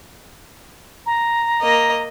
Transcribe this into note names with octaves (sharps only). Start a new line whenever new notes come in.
A#5
A#3 D#5